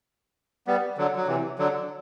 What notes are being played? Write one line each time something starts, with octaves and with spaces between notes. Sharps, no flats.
G3 B3
D3 F#3
F#3
C3 E3
D3 F#3